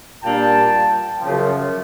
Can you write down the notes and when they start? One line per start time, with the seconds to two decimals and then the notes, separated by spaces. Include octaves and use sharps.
0.23 A#2 G3 A#3 D4 G5 A5
1.21 F#2 C#3 F3